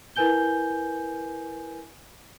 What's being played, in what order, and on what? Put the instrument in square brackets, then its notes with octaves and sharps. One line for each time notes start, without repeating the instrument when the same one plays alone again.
[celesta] E4 A#4 B4 G#5 G6 G7